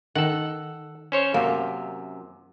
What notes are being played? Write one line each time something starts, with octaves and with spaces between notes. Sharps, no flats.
D#3 A4 F#5
C#4 C5 C#5
F#2 C3 A#3